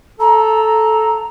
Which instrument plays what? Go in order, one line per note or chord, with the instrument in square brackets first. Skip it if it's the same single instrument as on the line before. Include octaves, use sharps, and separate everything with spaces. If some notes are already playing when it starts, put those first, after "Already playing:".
[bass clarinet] A4 [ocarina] A#5